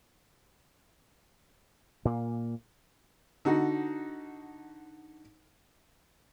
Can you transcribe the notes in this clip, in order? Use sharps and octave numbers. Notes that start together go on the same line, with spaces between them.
A#2 A#3
D3 D#4 F#4